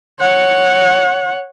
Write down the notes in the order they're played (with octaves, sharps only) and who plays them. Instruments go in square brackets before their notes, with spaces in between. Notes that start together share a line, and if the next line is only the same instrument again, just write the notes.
[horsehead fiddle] C#5 F#5